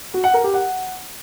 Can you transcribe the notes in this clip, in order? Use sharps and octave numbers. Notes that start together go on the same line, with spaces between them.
F#4
F#5
A#4
G4
F#5